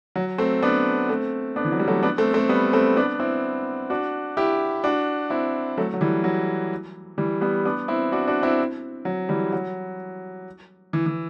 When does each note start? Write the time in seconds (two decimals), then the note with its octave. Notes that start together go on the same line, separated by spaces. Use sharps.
0.15 F#3
0.38 A3 C4
0.62 B3 D4
1.09 A3 C4
1.56 B3 D4
1.65 E3
1.72 F#3
1.79 G3
1.88 F#3 A3
2.03 B3 D4
2.18 A3 C4
2.34 A3 C4
2.49 G3 B3
2.73 A3 C4
2.96 B3 D4
3.20 C4 E4
3.90 D4 F#4
4.37 E4 G4
4.84 D4 F#4
5.30 C4 E4
5.77 F#3 A3
5.94 F#3
6.01 E3 G3
6.24 F#3
7.18 E3 G3
7.41 G3 B3
7.65 B3 D4
7.88 C4 E4
8.12 D4 F#4
8.27 D4 F#4
8.43 C4 E4
9.05 F#3
9.29 E3 G3
9.52 F#3
10.93 E3
11.06 E3